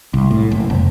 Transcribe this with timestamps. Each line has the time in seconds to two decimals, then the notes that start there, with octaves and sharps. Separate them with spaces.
0.14 C2
0.31 A2
0.51 F#1
0.70 F1